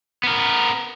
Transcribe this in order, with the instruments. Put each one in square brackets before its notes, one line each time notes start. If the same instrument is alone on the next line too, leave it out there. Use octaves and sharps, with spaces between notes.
[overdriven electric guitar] B3 A#4